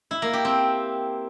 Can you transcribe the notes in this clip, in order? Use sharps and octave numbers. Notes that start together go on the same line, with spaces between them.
E4
A#3
G4
C4